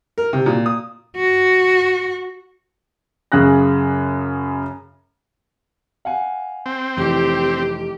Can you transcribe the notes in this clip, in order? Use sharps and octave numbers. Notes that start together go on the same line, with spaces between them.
A#4
C3
A#2
D#6
F#4
F#2 C#3 G#4 F#6 A#6
F5 F#5 G#5
C4
F1 E3 G4